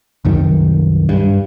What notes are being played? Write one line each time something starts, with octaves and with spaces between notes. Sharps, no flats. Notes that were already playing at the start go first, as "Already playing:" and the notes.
C2 F#2 D#3
G2